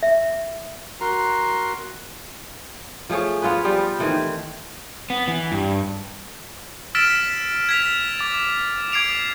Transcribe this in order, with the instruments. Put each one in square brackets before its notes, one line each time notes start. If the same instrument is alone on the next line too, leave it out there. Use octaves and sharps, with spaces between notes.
[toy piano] E5
[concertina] F#4 A#4 A#5 C6
[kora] F3 A3 G#4 C#5
B3 F4 G#4 B4
F3 G3 F4 G4
D#3 E3 A3 C4
[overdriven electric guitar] B3
E3
G2
[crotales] E6 F6 A6 B6 D7 E7
B6
G#6 B6 F7
D6 A6
D6 G#6 C7 D7 F7